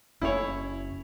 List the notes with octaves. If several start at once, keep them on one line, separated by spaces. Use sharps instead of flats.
F#1 C#4 E4 C#5